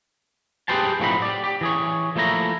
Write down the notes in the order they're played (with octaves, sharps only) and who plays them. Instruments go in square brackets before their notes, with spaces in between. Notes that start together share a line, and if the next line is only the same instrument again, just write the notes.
[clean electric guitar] G4 G#4 B4 C5 G5 A5
A2 F3 F#3 C4 D#4 B5
G4 D5
G4
E3 G#4 C#5
F3 A3 A#3 E4 A#5